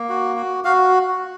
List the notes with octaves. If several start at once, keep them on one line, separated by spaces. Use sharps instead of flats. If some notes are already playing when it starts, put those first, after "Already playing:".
Already playing: A#3
F#4
F#4
F#4 F5